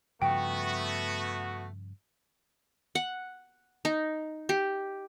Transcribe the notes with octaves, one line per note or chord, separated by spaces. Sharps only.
G2 C#3 F3 A3 B3 F#4 G5
F#5
D#4
G4